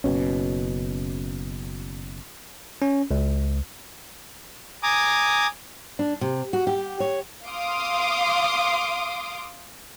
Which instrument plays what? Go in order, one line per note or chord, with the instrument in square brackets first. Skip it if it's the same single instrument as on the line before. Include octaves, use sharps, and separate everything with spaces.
[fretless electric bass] F#1 B2 C#4
[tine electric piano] C#4
C#2
[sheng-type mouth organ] G#5 A#5 D6 D#6
[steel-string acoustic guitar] D4
C3
F#4
G4
C#5
[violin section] F5 C6 D6 D#6